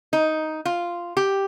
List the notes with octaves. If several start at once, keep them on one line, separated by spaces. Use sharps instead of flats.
D#4
F4
G4